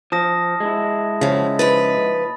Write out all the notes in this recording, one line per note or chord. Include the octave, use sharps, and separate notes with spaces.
F3 A5 D#6 A#6
G#3 E4
F#2 C#3 F3
D#2 F3 B4 B5 A6